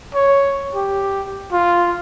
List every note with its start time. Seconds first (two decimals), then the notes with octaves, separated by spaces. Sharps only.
0.15 C#5
0.75 G4
1.53 F4